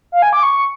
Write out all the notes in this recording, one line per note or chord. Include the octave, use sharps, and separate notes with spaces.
F5
G#5
D6
C#6